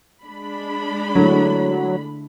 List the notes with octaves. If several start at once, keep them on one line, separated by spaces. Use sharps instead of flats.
G#3 D4 B5
D3 F#3 A3 E4